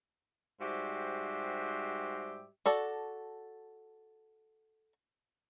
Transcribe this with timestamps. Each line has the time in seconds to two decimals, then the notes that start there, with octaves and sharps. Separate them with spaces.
0.61 G#2 G3 F#4 G4 C5 E5
2.66 F#4 A4 D5 A5